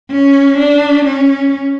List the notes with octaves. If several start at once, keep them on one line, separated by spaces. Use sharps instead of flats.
C#4
D4
C#4